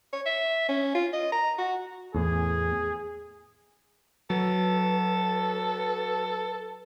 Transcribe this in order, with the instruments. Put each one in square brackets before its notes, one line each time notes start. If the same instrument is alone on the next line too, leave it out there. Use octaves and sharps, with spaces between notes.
[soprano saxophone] C#5
E5
C#4
F4
D#5
A#5
F#4
[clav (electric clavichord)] E2 A2 [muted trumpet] G#4
[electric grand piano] F#3 [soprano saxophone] A4 [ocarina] B4